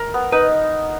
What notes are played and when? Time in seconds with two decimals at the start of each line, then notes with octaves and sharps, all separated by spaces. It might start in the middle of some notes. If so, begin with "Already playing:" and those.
Already playing: A#4
0.14 B3
0.32 D#4 B4